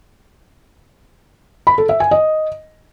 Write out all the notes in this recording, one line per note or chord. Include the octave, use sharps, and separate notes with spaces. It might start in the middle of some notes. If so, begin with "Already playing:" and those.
B5
A4
E5
G#5
D#5